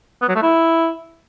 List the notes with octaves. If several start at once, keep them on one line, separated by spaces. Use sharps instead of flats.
B3
F#3
A3
E4